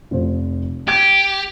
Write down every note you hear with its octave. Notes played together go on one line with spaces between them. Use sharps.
F1 F3 C5
G4 D6 G#6